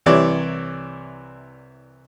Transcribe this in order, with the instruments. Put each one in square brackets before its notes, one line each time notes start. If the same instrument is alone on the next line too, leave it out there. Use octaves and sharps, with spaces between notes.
[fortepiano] C2 C3 E3 C#5 D5